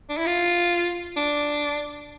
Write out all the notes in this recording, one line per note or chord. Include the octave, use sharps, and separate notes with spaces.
D4
E4
F4
D4